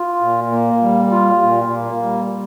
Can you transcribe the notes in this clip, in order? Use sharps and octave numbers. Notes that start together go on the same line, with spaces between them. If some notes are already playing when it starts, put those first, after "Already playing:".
Already playing: F4
A#2
A#3
G3
F4
A#2
A#3
G3